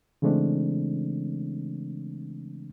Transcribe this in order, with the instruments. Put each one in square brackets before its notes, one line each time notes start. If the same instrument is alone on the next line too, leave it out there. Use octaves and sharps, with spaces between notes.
[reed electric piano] C#3 E3 G#3 A3 C4 D4